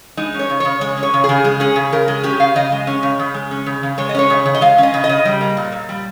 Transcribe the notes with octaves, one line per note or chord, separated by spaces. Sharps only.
G#3 D#4
C#4
C#5
C#3
C#3 C#5
G#3 C#5
C#4
C#5
C#3
G#4
C#3
G#3 G#4
C#4 G#4
C#3
C#3 A#4
G#3 G#4
C#4 G4
C#3 F5
C#3 D#5
G#3
C#4
C#3
C#3
G#3
C#4
C#3
C#3
G#3 C#5
D#5
C#4 C#5
C#3
C#3
D#5
G#3 F5
C#4 D#5
C#3
D#5
C#3
G3
A#3
A#2
A#2
G3